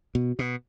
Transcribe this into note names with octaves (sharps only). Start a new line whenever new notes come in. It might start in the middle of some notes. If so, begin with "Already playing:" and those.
B2
B2